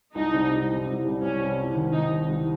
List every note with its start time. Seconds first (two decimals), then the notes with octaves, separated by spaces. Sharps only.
0.14 C2 D#4
0.32 C3 G3
0.50 C2
0.68 C3 G3
0.87 C2
1.04 C3 G3
1.21 C2 C#4
1.40 C3 G3
1.58 C2
1.75 C3 D#3
1.93 C2 D#4
2.10 C3 D#3
2.29 C2